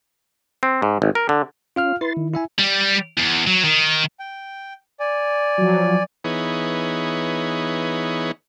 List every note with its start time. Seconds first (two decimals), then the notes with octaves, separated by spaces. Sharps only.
0.63 C4
0.82 G#2
1.02 G#1
1.15 A#4
1.29 D3
1.76 C#4 F4 F5 F6
2.01 E4 B4 C6 A6
2.17 D#3
2.33 E4 E5 G#5
2.59 G3
3.18 E2
3.47 F#3
3.64 D#3
4.20 G5
5.00 D5 G#5
5.58 F3 F#3
6.24 E3 B3 D#4 G#4 C#5